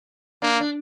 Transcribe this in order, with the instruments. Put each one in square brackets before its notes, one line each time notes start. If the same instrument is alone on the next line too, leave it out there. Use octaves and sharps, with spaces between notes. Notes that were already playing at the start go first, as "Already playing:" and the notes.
[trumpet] A#3 [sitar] D4
[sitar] D4